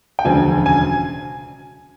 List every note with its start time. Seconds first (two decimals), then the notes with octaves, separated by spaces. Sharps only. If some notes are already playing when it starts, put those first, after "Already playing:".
0.19 G5
0.25 E1 D2 C#3 F3 G#5
0.66 G#5